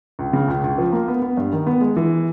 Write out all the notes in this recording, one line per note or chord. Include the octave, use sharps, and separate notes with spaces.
C#2
C#3
C#2
C#2
F3
A#3
B3
B3
G2
D#3
B3
G#3
E3